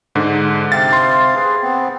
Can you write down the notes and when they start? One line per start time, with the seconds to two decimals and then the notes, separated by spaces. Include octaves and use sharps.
0.15 G#2 D3
0.72 C3 C4 F5 A6
0.93 C6
1.35 G#4 B4
1.63 B3 C4